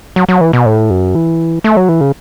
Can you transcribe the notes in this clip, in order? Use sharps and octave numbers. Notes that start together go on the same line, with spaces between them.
F#3
F#3
E3
B2
A2
F#2
E3
A3
F#3
E3
C#3